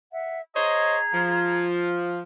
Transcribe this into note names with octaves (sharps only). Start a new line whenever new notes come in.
E5 F#5
G#4 C5 C#5 D#5 A#5 G#6
F3